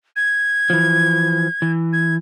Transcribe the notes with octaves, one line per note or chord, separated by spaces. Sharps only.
G#6
E3 F3
E3
G#6